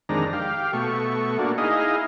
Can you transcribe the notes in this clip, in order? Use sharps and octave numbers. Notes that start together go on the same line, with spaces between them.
F2 D#3 G#3 D4 A#5
G4 F5
B2 A3 C#6
A#3 D4 F#4
D#4 E4 G#4 D#5 F5